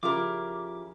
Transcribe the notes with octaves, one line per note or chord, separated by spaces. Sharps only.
C#3 F3 E4 F4 G4 A#4 D6